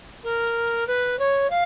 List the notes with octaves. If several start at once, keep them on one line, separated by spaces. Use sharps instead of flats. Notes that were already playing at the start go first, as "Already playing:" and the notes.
A#4
B4
C#5
F5